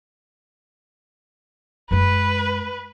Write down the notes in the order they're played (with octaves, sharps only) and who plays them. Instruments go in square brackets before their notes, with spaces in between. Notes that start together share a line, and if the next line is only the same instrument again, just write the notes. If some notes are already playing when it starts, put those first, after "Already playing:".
[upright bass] F#2 G#3 [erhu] B4